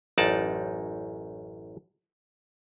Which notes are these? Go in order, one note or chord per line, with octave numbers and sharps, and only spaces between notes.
A1 F#2 D#4 D5 A5